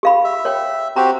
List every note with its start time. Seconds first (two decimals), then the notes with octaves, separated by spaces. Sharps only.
0.03 G4 F5 B5
0.25 E5
0.45 C#5 G5
0.96 C4 F#4 G4 A#5